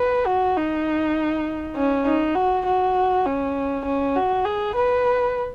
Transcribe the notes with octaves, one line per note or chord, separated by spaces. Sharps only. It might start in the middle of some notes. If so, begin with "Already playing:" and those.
Already playing: B4
F#4
D#4
C#4
D#4
F#4
F#4
C#4
C#4
F#4
G#4
B4